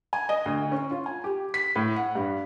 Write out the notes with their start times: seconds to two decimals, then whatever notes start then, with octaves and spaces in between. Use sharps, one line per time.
0.13 G#5
0.29 D#5
0.46 D2
0.72 C#4
0.91 F4
1.06 G#5
1.24 G4
1.54 B6
1.76 A2
1.96 F#5
2.15 G2